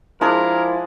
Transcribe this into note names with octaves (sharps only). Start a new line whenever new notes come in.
F3 G#3 D4 E4 G#4 A#4